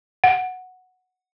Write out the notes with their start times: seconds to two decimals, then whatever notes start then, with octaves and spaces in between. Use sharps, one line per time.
0.24 F#5